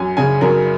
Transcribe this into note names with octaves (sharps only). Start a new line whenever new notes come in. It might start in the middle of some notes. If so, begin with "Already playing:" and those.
Already playing: F#2 G#5
C#3 G#5
F#2 A#4